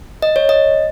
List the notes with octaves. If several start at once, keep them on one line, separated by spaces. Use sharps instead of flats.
D#5
C#5
D#5